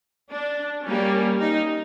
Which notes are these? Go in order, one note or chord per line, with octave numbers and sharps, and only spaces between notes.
D4
G3 A#3 C#4
D#4